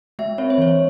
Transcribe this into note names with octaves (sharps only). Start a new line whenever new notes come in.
G#3 E5
C4 C#5
C5
E3 C#5